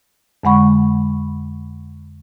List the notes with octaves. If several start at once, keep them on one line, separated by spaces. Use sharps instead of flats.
F2 D3 G#3 F#5 B5 C#6